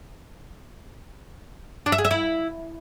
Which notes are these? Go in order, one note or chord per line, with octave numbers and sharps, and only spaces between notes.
D4
E5
G#4
E5
E4